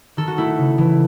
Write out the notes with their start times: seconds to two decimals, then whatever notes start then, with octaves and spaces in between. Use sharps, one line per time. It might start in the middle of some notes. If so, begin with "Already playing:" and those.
0.17 D#3 A4
0.28 F#4
0.38 A3 E4
0.58 C#3
0.78 E3 A3